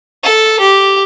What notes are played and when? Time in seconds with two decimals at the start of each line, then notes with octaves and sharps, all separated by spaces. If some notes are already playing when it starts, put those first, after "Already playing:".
0.23 A4
0.60 G4